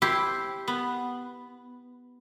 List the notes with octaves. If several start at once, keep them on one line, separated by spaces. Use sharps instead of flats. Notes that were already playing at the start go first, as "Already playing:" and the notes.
E4 G4 C5
B3